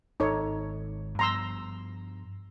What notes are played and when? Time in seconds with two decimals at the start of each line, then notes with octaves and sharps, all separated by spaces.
0.20 G#1 D#4 A4 C#5
1.19 G2 F3 B3 A#5 C6 E6